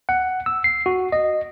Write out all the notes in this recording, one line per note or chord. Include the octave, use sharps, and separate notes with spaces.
F#5
E6
C7
F#4
D#5